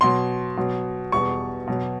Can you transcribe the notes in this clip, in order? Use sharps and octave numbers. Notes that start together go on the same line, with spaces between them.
B2 F#3 C6
B2 F#3
E2 B2 G3 C#6
B2 F#3